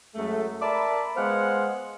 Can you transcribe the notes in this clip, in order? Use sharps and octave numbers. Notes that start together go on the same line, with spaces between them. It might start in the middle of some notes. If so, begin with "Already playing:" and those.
F#2 G#3 A3
A#4 D5 E5 A5 B5
G#3 B3 C5 F5 F#5